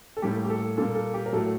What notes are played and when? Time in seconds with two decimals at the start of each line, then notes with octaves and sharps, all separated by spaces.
0.17 A4
0.22 A2 G3 A#3 G4
0.45 G4
0.50 A4
0.77 A#2 G3 A#3 A4
0.95 A4
1.14 G4
1.26 A#4
1.33 A2 F#3 A3 A4